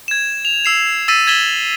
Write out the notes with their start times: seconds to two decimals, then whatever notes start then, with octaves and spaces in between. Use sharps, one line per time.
0.08 G#6 E7
0.45 F7
0.65 E6 C7 E7
1.08 E6 A6 B6 D#7
1.27 G#6 A6 B6 E7 F#7 G7